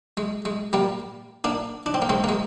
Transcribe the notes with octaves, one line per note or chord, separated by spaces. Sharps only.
G#3
G#3
G3 A#3
A#3 D4
D4
C4
A#3
G#3 C4
A#3
G#3